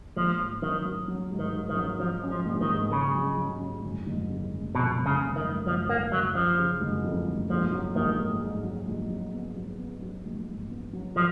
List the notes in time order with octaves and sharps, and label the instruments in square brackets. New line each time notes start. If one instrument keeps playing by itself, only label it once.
[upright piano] A#1 [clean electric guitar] F3
[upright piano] G#2
[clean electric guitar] D#3 [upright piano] F#3
[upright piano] F#3
F#3
G#2
[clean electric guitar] D#3
[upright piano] G#2
[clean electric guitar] D#3
[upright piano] F#3
[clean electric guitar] F3 [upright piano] F#3
[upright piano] C#4
[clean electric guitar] F3
[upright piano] A#1
[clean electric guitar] D#3
[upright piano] G#2
[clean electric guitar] C#3 [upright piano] C#4
[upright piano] F#3
F#3
C#4
F#1
F#1
C#3
F#1
[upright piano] F2 [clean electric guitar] B2
[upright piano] F#1
[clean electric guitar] C#3
[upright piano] F#1
[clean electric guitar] D#3
[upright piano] F#1
[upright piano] F#1 [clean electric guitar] F3
[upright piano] F#1 [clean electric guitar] A#3
[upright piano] F#1 [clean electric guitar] F#3
[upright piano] C#3 [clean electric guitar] F3
[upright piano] C#3
F#1
F2
F#1
[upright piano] A#1 [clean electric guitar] F3
[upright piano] F#3
[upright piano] A#1 [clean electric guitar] D#3
[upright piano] G#2
G#2
F#3
A#1
F#3
B3
F#3
B3
F#3
A#1
G#2
B3
F#3
[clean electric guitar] F3